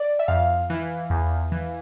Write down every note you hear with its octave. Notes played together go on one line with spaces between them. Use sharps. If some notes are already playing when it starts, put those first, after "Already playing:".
Already playing: D5
E5
F2 F5
E3
E2
E3